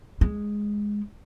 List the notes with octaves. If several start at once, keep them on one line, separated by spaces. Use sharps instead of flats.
G#3